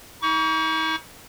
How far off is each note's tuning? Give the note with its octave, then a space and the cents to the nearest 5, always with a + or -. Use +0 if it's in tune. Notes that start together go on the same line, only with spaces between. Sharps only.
D#4 +40 C#6 +40